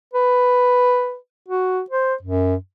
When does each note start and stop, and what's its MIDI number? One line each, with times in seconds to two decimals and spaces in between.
0.14 1.16 71
1.49 1.81 66
1.90 2.14 72
2.22 2.55 42